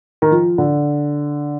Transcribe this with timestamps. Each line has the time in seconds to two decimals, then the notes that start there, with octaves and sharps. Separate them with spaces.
0.22 D#3
0.31 F3
0.58 D3